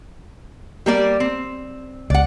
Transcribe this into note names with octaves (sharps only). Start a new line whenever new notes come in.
G3 A#3 D5
C4
C#2 D5 F#5